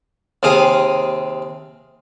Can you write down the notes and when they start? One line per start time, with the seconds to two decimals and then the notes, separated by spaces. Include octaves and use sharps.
0.43 D#2 C3 G#4 F5 D#6